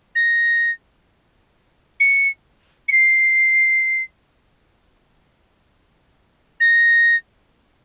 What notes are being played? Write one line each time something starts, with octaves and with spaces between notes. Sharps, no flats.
A#6
C#7
C#7
C7
A#6